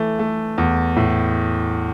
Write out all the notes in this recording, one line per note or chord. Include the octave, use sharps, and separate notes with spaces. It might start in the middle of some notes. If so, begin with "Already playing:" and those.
Already playing: E3 A3
A3
E2
A2